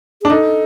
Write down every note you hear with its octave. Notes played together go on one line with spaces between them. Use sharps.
D4 G#4
D#4 A4